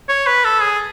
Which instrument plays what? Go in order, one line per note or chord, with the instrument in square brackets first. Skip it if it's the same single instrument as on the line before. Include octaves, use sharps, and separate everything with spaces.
[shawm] C#5
B4
A4
G#4